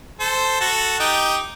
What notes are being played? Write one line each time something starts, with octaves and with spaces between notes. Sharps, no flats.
A4 C5
F#4 A4
D#4 G4